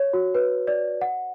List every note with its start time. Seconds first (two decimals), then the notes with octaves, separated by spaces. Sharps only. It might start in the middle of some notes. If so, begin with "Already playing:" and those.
Already playing: C#5
0.13 F#4
0.35 B4
0.67 D5
1.01 F#5